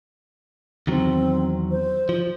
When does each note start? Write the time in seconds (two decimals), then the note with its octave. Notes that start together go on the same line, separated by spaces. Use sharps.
0.87 E2 D#3 F#3 C4
1.71 C5
2.09 F3